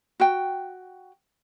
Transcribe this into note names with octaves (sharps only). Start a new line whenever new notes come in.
F#4 G5